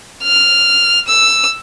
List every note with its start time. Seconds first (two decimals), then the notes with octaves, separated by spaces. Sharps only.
0.23 F6
1.08 E6